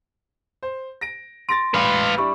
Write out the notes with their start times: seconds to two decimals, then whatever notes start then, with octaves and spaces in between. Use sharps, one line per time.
0.63 C5
1.01 A#6 D7
1.49 C6 A6 A#6 D7
1.74 A1 B4 F5
2.18 G3 D4 E4 B5 C#6